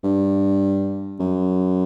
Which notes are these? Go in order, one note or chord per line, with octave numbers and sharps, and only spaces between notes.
G2
F#2